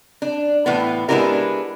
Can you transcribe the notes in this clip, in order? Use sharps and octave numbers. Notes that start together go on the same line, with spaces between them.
D4
A2 E3 B3
G#3 B3 D4 E4 G4 A#4